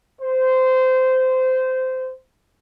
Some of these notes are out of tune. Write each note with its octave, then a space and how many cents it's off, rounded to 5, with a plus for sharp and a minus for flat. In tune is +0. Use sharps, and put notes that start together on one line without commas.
C5 -20